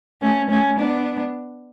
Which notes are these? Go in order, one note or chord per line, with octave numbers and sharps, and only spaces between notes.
A3 C#4
A3 C#4
B3 D4